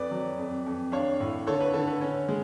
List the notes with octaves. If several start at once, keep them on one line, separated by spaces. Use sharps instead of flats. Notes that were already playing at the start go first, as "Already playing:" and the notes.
Already playing: F2 B4 D5
F#3
F2
F2
D4 C#5 F5
A2
D3 A4 C#5
B4
D3 A4
B4
C#4
G#3